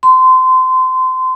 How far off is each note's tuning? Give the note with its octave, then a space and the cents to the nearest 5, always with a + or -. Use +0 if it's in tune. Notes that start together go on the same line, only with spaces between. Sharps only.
C6 -25